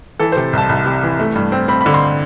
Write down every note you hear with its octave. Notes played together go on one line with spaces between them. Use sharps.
E3 A4
C3 C5
C2 A5
C2
C3
E3
A3
G2
C4
C4 B5
B5
D3
C6